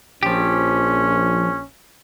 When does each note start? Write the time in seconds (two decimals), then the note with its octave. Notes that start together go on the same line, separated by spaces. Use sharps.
0.23 A#1 F3 C#4 G4